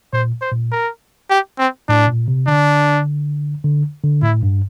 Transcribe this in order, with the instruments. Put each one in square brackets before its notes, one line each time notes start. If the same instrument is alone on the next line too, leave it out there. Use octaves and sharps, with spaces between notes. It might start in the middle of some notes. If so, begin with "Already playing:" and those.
[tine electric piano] A#2 [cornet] C5
[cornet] C5
[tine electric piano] A#2
[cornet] A#4
G4
C4
[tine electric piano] A2 [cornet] D4
[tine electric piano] A#2
C3
[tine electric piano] D3 [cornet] D4
[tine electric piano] D3
D3
[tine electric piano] A2 [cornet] E4
[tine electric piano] G2